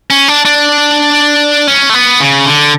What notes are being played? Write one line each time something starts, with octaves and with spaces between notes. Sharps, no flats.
C#4
D4
D4
C#4
A3
B3
C#3
D3